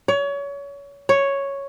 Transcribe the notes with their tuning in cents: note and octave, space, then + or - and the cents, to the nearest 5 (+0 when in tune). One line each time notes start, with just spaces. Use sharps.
C#5 +30
C#5 +0